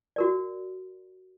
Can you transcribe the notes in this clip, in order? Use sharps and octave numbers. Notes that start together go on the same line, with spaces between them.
F#4 A#4 D5